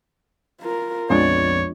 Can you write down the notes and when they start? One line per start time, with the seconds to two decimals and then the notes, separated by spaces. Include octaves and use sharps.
0.61 F4 A#4
1.10 A#1 F2 F3 G#3 B3 D4 C#5 D5